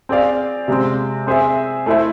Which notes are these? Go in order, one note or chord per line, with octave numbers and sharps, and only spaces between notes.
C4 G#4 D5 F5
C3 G#3 C4
C4 G#4 C5 E5
A3 E4 A4 C5 E5